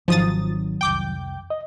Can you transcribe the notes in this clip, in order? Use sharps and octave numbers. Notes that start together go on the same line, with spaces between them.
G#1 D#3 F3 F#3 D#6 A6
C2 F2 G5 D6 G6
D#5